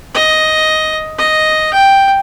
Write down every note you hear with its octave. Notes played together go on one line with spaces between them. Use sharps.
D#5
D#5
G5